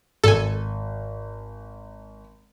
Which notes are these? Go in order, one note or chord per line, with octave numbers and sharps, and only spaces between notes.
G#1 A4 G#5